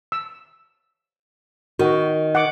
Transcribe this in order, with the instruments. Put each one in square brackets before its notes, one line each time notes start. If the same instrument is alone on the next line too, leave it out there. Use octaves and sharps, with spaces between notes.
[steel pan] E6
[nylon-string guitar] D#3 [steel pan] F#4
[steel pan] F#5 D6